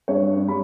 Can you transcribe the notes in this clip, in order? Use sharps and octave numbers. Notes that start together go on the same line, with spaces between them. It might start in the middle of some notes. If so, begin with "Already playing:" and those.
G2 C#5
G3 B5